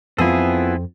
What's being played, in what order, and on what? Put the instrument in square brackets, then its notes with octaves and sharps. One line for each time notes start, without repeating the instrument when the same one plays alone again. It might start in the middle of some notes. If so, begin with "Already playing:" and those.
[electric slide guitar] F2 [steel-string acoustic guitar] B3 F4 [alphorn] C4 [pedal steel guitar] E4 G#4 A4